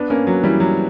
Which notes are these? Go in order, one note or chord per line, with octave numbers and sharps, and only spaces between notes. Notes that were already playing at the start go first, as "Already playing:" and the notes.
Already playing: B3 D4
A#3 C#4
F#3
E3 G3
F#3